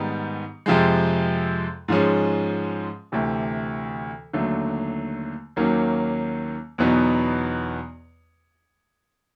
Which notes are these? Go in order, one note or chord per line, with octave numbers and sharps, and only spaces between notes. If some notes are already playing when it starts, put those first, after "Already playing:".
Already playing: G#2 D#3 G3 B3 D#4
F2 C3 F3 G#3
G#2 F3 G#3 C#4
D2 C3 E3
D#2 D3 F#3 A3
D#2 D#3 F#3 A#3 C#4
E2 B2 F#3 B3 D#4